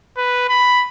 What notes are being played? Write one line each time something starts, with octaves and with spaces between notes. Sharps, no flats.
B4
B5